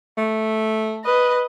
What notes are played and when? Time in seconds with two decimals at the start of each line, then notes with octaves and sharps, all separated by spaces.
0.17 A3
1.05 B4 D#5